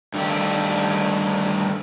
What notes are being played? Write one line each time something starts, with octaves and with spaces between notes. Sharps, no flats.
G2 D#3 A3 G4